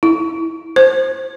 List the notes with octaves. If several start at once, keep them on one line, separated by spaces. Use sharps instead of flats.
E4
C5